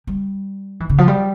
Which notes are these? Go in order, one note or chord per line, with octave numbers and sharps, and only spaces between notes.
G3
E3
C#3
F3
G3